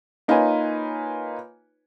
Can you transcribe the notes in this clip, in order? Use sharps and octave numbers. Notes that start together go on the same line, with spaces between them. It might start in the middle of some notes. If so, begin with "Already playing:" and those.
A#3 D#4 F4 B4 C#5 G#5